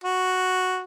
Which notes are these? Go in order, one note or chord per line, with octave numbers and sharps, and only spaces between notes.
F#4